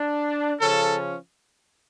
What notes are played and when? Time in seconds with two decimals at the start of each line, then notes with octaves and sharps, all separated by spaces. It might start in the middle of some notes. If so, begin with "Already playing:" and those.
Already playing: D4
0.60 C#3 F3 C#4 A4